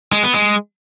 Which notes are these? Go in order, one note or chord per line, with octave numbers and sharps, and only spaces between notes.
G#3
B3
G#3